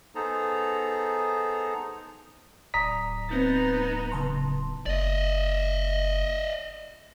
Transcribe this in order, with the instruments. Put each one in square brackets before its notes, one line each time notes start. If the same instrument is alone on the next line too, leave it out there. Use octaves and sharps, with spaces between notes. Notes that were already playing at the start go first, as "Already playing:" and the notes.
[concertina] B3 D#4 G#4 A4 C5 A#5
[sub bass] D1 [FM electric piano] D5 [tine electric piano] A#5 D#6 B6
[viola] B3 D#4 [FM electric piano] C4 G6 A6
[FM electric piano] C#3 A5 C6
[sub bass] F#1 [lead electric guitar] D5 D#5